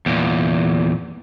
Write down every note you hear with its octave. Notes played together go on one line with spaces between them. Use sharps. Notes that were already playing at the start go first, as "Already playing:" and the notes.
E2 A#2